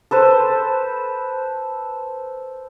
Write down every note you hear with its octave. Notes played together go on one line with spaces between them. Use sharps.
A4 B4 C5